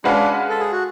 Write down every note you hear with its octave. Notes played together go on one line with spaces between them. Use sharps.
G#3 C#4 D4 F#4 B4 F5
A4
G#4
F#4